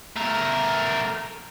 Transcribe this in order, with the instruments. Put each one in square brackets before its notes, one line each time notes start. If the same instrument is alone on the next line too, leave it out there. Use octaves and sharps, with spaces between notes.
[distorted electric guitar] A3 A#4